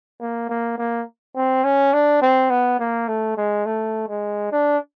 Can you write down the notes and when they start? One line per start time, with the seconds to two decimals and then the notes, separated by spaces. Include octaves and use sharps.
0.21 A#3
0.49 A#3
0.78 A#3
1.36 C4
1.64 C#4
1.93 D4
2.22 C4
2.50 B3
2.80 A#3
3.08 A3
3.37 G#3
3.66 A3
4.09 G#3
4.52 D4